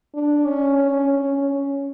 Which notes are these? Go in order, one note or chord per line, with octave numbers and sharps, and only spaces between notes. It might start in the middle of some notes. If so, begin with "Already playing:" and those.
D4
C#4
C#4
C#4
C#4